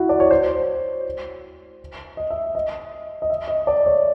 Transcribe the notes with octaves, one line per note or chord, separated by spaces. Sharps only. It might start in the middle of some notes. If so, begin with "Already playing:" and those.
Already playing: E4 F#4
D5
C#5
C5
D#5
E5
D#5
D#5
E5
D#5
D5
C#5